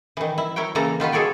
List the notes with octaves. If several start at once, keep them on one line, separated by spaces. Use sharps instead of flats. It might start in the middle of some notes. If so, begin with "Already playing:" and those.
D#3 E3
E4
E4 A#4 C#5 G5
C#3 E3 A#3 A4 A#5
D#3 F4 F#4 B4
G#4 A4 C#5 D5 G5